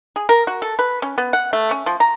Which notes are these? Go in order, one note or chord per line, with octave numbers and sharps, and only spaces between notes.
G#4
A#4
F#4
A4
B4
C#4
B3
F#5
A3
C#4
F3
A#5